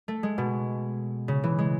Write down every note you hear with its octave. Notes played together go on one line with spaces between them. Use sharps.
A3
G#3
B2
C#3
E3
G#3